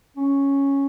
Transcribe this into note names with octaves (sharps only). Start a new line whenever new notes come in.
C#4